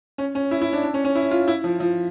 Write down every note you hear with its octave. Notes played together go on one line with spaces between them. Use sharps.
C#4
C#4
E4
E4
D4
D4
C#4
C#4
E4
F4
E4
F3
F3